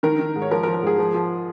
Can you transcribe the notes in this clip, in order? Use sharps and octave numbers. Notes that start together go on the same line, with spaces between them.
D#3 A#4
D#3
G#2
C#5
F3 A#4
A#4
F3
A#4
G#2 G#4
F3
F3